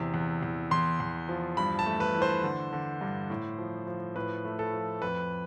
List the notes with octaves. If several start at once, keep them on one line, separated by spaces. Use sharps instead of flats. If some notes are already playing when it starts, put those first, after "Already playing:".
Already playing: E2 C3
E2
E2
E2 C6
E2
F3
G2 B5
A5
A3
B4
E3
C5
D3
D3
G2
A2
F3
F3
A2 B4
A3
A4
F3
F2 B4